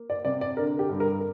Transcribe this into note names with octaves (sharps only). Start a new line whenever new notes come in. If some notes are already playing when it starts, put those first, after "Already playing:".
Already playing: A#3
D5
C3 D5
D5
D3 A#4
G4
G2
A#4